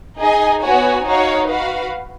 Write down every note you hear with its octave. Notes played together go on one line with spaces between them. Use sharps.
D#4 G#4 D#5 G#5
B3 F#4 C#5 G#5
D#4 F#4 C#5 F5
F#4 B4 F5